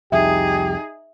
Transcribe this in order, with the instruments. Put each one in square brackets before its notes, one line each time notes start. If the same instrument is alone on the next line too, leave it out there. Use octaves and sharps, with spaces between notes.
[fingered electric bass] C2 F2 [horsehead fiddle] D#4 G#4 [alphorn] G4 [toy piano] E5